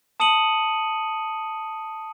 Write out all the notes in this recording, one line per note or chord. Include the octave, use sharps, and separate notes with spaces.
A5 D#6 C#7 D#7 F#7